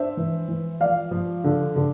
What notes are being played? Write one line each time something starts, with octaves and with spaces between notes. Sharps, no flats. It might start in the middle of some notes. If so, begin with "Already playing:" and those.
Already playing: D4 C5 E5
E3
E3
F3 D5 F5
F3
D3
D3